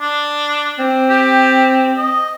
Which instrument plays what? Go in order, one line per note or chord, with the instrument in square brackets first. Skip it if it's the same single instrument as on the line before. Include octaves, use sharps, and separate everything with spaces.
[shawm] D4
[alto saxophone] C4
[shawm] G4
D#5